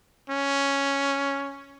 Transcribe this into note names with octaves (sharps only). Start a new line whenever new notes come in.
C#4